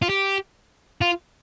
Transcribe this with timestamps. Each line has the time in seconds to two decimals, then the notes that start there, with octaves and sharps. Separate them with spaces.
0.02 F4
0.09 G4
1.01 F4